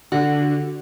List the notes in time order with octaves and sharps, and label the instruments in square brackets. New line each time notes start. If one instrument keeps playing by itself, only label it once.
[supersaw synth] D3 [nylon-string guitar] F#4